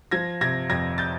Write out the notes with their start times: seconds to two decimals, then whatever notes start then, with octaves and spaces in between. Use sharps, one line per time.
0.11 F3 G#6 A#6
0.41 C3 G#6 A#6
0.70 F2 G#6 A#6
0.98 G6 A6